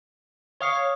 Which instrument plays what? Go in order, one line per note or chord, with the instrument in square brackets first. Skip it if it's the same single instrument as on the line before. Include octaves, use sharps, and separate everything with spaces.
[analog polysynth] C#5 F5 [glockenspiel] C#6 D#6 C7